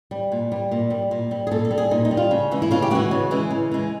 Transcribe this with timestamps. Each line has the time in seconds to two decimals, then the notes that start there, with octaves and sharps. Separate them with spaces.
0.11 G3
0.32 A#2
0.52 G3
0.71 A#2
0.90 G3
1.11 A#2
1.31 G3
1.47 G#4
1.52 A#2 A4
1.65 A4
1.71 G3
1.78 G#4
1.91 A#2 D#4
2.05 D#4
2.11 G3
2.17 F4
2.31 C#3
2.51 E3 G#3
2.62 E4
2.71 C#3 F4
2.82 G4
2.90 E3 G#3 F#4
3.11 C#3
3.31 E3 G#3
3.50 C#3
3.71 E3 G#3